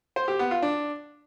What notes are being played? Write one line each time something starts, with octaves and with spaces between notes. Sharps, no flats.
C5
G4
B3
F4
D4